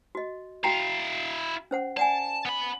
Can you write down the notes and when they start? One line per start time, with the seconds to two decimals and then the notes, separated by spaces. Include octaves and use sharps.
0.15 F#4 D#5
0.64 E4 F#4 F5 G5 A#5
1.71 C#4 C5 F#5
1.97 D5 F#5 G#5 A5
2.45 B3 B5